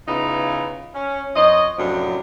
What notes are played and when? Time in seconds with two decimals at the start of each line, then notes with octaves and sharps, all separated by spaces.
0.08 C#3 E3 B3 D#4 F4
0.95 C#4
1.36 F2 C5 C#5 D#5
1.78 F#2 A2 C3 F3 F#3 D4